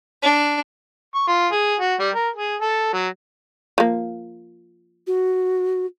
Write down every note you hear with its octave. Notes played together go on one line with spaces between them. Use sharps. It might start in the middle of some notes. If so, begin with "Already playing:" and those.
D4
C#6
F4
G#4
F#4
G3
A#4
G#4
A4
F#3
F3 A#3
F#4